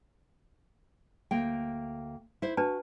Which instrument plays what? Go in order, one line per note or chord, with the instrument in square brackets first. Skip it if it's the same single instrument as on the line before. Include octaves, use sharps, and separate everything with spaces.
[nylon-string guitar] D2 A#3 G5
E4 C5
[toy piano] D4 B4 A5 [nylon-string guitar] F#4